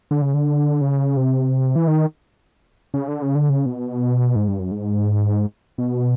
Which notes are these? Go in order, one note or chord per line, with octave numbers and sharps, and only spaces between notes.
D3
C#3
D3
C#3
C3
E3
D#3
C#3
D3
C#3
D3
C#3
B2
G#2
G2
F#2
G#2
B2